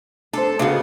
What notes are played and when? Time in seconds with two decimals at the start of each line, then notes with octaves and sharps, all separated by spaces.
0.33 D4 A4 C5
0.59 C#3 B3 D4 F#4 D#5